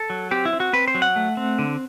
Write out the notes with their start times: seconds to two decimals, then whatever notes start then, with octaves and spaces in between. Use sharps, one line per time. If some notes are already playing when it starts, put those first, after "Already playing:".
Already playing: A4
0.10 F#3
0.31 C4 G4
0.45 E4
0.53 C4
0.60 F#4
0.73 C4 B4
0.88 C5
0.95 F#3
1.02 F#5
1.16 A3
1.37 C4
1.59 D3